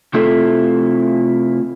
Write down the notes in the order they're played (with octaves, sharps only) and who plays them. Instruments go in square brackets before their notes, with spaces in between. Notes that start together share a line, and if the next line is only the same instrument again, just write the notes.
[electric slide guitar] C3 A3 C4 E4 F4 A4